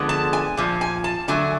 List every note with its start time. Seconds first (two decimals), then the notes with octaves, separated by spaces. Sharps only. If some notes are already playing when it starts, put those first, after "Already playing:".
Already playing: D3 F3 G#3 B3
0.09 A5
0.33 G#5
0.57 A#2 F3
0.81 G#5
1.04 A5
1.28 D3 F#3 A3 G#5